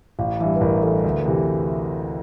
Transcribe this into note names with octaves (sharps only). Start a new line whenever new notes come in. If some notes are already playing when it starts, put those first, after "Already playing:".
A1 F5
G2 E3 E5
B4
A1 A#4
G2 E3 A4
D2
C3 E3